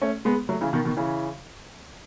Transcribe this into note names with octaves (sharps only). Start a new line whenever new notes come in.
A3 C#4
G#3 B3
F#3 A3
C#3 E3
B2 D#3
B2 D#3
C#3 E3